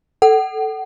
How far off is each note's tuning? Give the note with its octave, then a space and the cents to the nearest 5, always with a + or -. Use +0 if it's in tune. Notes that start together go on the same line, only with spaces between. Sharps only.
A4 +0 F#5 +40